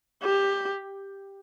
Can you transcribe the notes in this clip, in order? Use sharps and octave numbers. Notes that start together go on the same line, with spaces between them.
G4